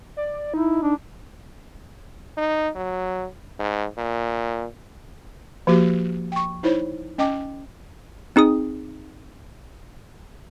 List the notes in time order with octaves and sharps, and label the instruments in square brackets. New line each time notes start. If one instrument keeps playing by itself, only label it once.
[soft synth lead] D5
[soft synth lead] D#4 [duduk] E4
[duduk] D4
[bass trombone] D#4
F#3
G#2
A#2
[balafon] F3 A#3 F#4 G4
G5 C#6
D#4 E4 C5 C#5
C#4 D#5 G5 A5 D6
[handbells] C4 D#4 G#4 D#6